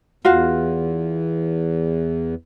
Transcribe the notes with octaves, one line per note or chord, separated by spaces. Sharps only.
E2 F4 F#4 F5